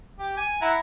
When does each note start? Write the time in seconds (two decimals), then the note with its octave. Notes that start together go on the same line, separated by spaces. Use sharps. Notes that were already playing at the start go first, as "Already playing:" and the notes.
0.19 G4
0.37 G#5
0.62 E4 F#5 A#5